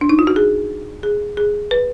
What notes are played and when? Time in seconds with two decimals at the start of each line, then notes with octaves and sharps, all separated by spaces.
0.01 D4
0.09 D#4
0.19 F4
0.27 F#4
0.36 G#4
1.03 G#4
1.37 G#4
1.71 B4